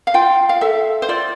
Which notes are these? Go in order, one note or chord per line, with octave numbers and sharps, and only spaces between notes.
F5
F4 G5
F5
A4 E5
C5
F4 D5